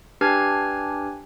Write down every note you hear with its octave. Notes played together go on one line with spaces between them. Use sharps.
D4 G4 B4 G#5 F6 G#6